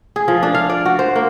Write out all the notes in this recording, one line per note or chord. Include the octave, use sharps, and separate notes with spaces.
G#4
F3
D4
F5
D5
F#4
C5
A#3